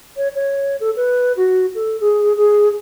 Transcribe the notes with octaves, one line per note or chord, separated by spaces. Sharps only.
C#5
C#5
A4
B4
F#4
A4
G#4
G#4